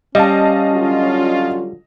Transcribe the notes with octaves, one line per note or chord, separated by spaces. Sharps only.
G3 C#4 D#5 F5 A5
D3 F#3 F4